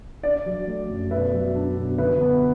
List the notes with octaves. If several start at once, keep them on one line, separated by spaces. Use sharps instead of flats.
D4 D5
F#3
A3
F#2
B2 B4 E5
F#3
D4
B2
D3 B4 E5
B3